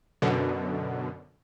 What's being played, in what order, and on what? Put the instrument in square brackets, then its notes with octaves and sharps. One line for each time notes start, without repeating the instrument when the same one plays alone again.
[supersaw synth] F#2 B2 D3